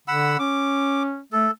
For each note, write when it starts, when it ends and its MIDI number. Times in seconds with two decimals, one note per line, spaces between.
0.08 0.37 50
0.08 0.37 78
0.08 0.37 83
0.08 0.37 88
0.39 1.19 61
0.39 1.03 86
1.33 1.48 57
1.33 1.51 69